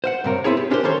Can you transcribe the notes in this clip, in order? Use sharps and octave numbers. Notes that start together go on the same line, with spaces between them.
C5 F5 F#5
G2 C3 A#4 C#5
B3 C4 E4 G#4 C#5
G4
C#4 D4 G4 A#4 C5
D#3 E3 C#4 A4 C5 C#5